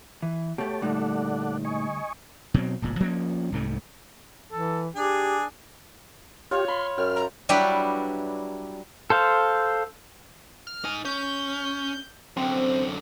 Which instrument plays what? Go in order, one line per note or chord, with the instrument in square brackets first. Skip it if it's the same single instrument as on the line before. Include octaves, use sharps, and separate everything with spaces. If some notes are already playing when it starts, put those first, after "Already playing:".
[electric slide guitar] E3
[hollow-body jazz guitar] B2 A3 [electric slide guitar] G4 [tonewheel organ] C#5 A5
[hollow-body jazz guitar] D2 G3 [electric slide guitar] A#2 A3 D#4 [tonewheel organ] A4 D5 F#5
[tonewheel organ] D#5 G#5 C#6
[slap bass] B2 F#3 C4
D1 G1 A#2
F3 A#3 C#4
C2 G#2 C3 A3
[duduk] E3 [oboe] A4
[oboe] D4 [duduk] G4 [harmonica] G#4
[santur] F4 F5 [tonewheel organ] G4 [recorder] C#5
[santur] B5 [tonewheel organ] C6
[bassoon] F#2 [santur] G5 [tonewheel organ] F6
[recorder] A#5
[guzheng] F#3 G3 D4 E4 G4 B4
[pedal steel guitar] A4 C5 F5
[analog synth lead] F6
[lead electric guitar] D#4 G#5
[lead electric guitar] C#4 [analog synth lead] G6
[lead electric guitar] F#2 D3 [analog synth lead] C4